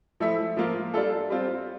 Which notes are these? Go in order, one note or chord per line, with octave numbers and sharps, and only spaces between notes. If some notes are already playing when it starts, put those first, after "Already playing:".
F3 A3 E4 A4 E5
F3 A#3 F4
G3 D4 F4 A4
G3 C4 F4